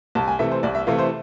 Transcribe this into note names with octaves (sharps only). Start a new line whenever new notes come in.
C2 A5
G#5
C3 E3 A3 E5
C5
C2 D5
E5
C3 E3 A3 F5
C5